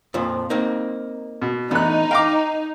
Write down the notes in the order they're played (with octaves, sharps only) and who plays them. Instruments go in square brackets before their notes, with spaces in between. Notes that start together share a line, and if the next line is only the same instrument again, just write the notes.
[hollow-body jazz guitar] F2 A#2 F3
A#3 C4 D#4
[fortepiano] B2
[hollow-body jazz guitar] E3 A3 D4 [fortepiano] B3 F#6 [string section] D#4
[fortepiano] F5 A#5 D6 [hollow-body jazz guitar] G5